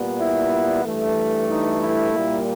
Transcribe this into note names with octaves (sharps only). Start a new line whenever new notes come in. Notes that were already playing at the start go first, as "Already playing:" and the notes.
Already playing: A#2 G3 B3
E4
G2 E3 A3
D#4
E4
A#2 G3 A#3